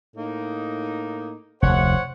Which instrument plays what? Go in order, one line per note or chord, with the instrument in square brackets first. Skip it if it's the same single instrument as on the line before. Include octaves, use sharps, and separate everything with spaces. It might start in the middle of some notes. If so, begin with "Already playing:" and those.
[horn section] A2 A#3 D#4
[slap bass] F1 D2 [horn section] C5 C#5 F#5